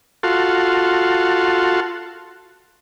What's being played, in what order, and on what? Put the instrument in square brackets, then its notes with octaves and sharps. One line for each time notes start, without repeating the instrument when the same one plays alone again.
[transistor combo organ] F4 F#4 A4 C6